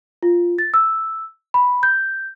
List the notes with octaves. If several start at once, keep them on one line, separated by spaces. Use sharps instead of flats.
F4
A6
E6
B5
G6